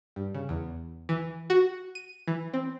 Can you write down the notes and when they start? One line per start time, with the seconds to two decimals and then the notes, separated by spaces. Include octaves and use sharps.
0.16 G2
0.34 C#3
0.49 E2
1.09 E3
1.50 F#4
1.95 D#7
2.28 E3
2.54 C4